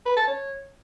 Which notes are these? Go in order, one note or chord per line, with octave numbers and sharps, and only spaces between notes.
B4
A5
C#5